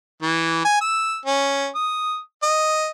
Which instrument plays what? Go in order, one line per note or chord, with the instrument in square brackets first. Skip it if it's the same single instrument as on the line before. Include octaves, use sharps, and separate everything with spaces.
[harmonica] E3
G#5
E6
C#4
D#6
D#5